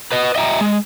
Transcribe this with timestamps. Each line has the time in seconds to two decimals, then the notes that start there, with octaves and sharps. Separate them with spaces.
0.12 B4 D#5
0.35 D#5 E5 G5 A#5
0.61 G#3